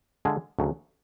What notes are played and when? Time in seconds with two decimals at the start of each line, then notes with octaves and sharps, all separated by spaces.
0.25 D3 G#3 D4 F4
0.59 D2 C#3 F#3